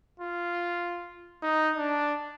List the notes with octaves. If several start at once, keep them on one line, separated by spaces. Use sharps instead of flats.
F4
D#4
D4